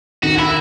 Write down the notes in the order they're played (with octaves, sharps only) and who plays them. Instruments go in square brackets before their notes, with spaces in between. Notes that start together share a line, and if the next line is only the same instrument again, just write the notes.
[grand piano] D#3 [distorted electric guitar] F#4
[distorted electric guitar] E4